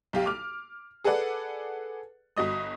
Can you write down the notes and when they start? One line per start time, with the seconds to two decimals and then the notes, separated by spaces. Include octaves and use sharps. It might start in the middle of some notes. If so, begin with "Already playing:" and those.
0.13 B1 G4 F5
0.26 D6 F6
1.04 G#4 A4 B4 D5 F#5
2.37 G1 F#4 D#5 D#6